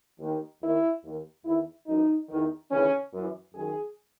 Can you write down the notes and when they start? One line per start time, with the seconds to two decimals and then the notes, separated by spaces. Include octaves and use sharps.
0.18 D#2 D#3
0.61 D#2 D#3 E4
1.03 D#2 D#3
1.44 E2 D#3 E4
1.86 F#2 E3 D#4
2.29 E2 D#3
2.70 D#2 C#3 E3 C#4
3.12 F#2 E3
3.54 F#2 D#3 G#4